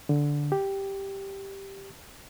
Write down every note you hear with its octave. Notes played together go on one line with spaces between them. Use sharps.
D3
G4